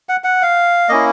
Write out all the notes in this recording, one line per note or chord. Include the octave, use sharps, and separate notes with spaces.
F#5
F#5
F5
A#3 C#4 E4 D#5